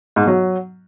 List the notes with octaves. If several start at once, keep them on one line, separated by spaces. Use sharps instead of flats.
G#2
B2
F#3